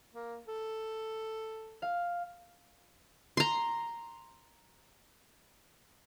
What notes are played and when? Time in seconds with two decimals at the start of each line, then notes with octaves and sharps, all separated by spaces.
0.14 A#3
0.48 A4
1.82 F5
3.37 A#5 C6